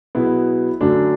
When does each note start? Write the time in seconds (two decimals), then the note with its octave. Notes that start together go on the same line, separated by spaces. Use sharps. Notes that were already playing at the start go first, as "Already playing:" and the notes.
0.15 B2 F#3 B3 E4 G#4
0.81 F#2 D3 F#3 A3 D4